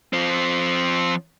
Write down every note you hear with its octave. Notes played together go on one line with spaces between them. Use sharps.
F3 C4